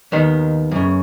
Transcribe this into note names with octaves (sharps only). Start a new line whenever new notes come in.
D#2 D#3 B3
F#2 C#3